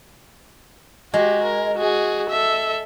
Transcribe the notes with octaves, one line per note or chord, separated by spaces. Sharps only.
G#3 F#4 G4
A#4
F#4 G#4
A4 E5